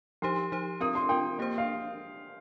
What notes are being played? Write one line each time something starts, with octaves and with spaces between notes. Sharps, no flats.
F3 D#4 G4 C5 C6
F3 D#4 G4 C5
C4 F4 A#4 D#6
C6
C4 F4 A#4 G5
A#3 G4 C5
F5